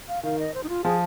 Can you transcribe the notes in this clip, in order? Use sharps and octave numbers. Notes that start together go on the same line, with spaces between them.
F5
D#3 F5
D#5
C5
D#4
F4
F3 G#4